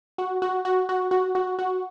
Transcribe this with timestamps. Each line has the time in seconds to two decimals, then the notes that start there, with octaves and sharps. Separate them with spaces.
0.18 F#4
0.42 F#4
0.65 F#4
0.89 F#4
1.11 F#4
1.35 F#4
1.59 F#4